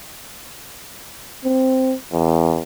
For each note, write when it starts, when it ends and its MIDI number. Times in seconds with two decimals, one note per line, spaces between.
1.45 1.95 60
2.13 2.63 40